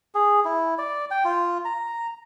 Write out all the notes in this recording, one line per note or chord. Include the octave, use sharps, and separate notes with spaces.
G#4
E4
D5
G5
F4
A#5